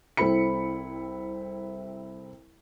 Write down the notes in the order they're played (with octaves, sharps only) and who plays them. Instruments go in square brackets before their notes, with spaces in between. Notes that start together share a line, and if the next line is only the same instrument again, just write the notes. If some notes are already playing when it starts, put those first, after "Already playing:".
[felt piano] C2 C4 E4 A4 B5 C#7